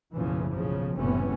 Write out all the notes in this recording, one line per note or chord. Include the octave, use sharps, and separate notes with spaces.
F#1 B1 A2 C#3 E3 F3
B1 A2 C#3 F3
F#1 A2 C3 E3 B3 C#4